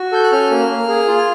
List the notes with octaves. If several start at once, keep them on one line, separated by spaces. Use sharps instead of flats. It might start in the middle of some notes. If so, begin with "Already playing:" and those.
Already playing: F#4
A4 G6
F#6
C#4 F6
A#3
A#3
G#4
F4